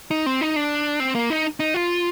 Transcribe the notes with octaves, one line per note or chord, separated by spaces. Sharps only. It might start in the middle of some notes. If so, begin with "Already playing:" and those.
D#4
C4
D#4
D4
C4
A#3
D#4
D#4
F4